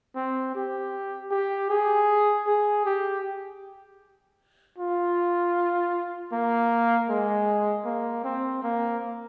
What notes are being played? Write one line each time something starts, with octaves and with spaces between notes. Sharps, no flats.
C4
G4
G4
G#4
G#4
G4
F4
A#3
G#3
A#3
C4
A#3